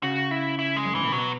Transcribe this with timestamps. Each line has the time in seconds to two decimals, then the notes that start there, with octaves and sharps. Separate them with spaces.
0.03 C#3 F#4
0.31 E4
0.59 E4
0.76 G#3
0.85 F#2
0.95 G#2 E3
1.04 A#2
1.12 B2 F#3